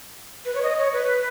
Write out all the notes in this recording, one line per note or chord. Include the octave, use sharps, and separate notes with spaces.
B4
C#5
D#5
C#5
B4